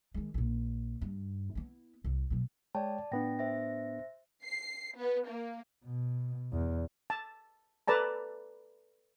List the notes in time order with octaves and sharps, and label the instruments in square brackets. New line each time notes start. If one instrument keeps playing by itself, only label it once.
[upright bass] D#3 G#3
A#1 A#2
G2
B3 E4
C2
B2 F#3
[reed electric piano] G#3 C#5 G5 [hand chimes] D5 A5
[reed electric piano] A2 B3 D4 [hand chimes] G5 A#6
[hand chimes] C5 E5 A#6
[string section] C7
B3
A#3
[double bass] B2
E2
[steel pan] A5
A4 B4 D5 A5 A#5